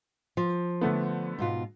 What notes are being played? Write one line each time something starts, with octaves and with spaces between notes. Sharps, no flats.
F3
D3 A3 B3
G#2 B2 F4